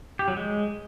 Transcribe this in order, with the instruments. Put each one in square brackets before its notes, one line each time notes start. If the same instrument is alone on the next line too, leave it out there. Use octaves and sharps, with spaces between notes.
[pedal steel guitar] G4
F#3
G#3